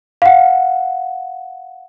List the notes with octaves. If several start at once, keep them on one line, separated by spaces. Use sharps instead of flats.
F5 F#5